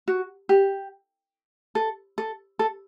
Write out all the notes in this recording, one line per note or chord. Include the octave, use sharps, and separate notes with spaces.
F#4
G4
A4
A4
A4